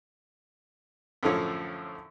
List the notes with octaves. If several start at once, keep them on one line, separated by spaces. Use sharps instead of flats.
F#2 A2 D3 F3 C#5 F5